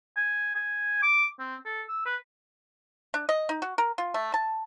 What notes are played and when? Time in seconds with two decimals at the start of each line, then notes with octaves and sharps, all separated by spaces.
0.17 G#5
0.55 G#5
1.03 D6
1.40 C4
1.65 A4
1.88 E6
2.06 B4
3.14 D4
3.29 D#5
3.49 D#4
3.62 F#4
3.78 A#4
3.98 F4
4.14 A3
4.34 A5